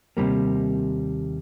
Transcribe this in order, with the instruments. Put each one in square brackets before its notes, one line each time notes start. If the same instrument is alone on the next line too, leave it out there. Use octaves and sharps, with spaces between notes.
[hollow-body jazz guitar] D#2 C3 D#3 G3 A#3